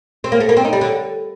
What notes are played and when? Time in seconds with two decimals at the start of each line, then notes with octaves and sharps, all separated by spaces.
0.24 C4
0.32 A#3
0.40 A3
0.49 A#3
0.57 C4
0.65 D#4
0.73 G3
0.81 D3